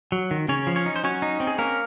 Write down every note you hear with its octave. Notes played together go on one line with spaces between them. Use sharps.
F#3
D#3
C#3 C#4 C#5
F3
C#4 C#5
D#4
C5
F#3 C#4 C#5
D#4
C4
G#4
A#3 C#4 A#4